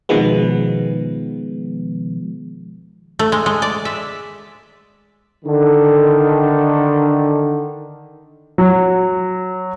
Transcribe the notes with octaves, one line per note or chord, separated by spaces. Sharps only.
B2 D#3 F3 G#3 B3
A3
G#3
G#3
D5
E5
D3 D#3
F#3